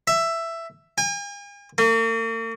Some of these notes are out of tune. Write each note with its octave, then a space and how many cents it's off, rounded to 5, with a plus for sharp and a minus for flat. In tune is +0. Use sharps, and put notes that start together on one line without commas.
E5 +10
G#5 -45
A#3 -45